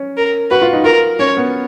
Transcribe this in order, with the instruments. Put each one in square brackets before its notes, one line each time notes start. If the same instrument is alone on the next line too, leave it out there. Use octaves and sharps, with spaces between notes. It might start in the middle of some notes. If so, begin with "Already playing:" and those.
Already playing: [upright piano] C#4
[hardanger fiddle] A#4
[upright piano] F#4 [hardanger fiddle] B4
[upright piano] F4
D#4
[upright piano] F4 [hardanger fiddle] A#4
[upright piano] C#4 [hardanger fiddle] C#5
[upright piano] B3